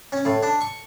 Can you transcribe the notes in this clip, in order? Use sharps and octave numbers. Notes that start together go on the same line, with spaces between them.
C#4
A2
D4
C#6